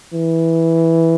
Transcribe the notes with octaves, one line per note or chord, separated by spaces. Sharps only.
E3